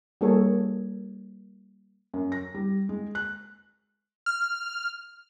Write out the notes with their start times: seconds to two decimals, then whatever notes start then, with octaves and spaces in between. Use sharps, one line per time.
0.21 G3 A#3 D4 G#4 A4 C#5
2.14 F#2
2.32 A#6
2.54 G3
2.89 G#3
3.15 F#6
4.26 F6